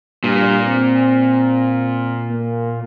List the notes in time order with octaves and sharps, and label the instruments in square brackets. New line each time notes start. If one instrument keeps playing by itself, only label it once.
[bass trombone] G2 [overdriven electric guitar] A#2
[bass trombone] C4
A#3